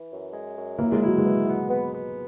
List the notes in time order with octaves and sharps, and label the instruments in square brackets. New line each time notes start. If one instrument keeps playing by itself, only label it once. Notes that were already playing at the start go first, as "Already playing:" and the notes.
Already playing: [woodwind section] E3
F#2
G#3
F#2
[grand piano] A#3 [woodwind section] E4
[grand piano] G#3
[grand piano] F#3 [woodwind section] E4
[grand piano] G#3
[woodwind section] B3
B3
B3
B3